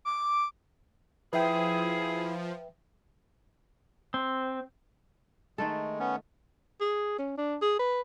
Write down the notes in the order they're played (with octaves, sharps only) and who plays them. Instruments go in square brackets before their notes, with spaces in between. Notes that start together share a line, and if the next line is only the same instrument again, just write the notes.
[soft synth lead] D6
[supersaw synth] F3 [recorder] E4 [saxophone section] G#4 [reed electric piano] B4 E5 G5
[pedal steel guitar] C4
[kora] D#3 A3 A4 [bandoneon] G#3
[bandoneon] B3 C#4
[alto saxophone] G#4
C#4
D4
G#4
B4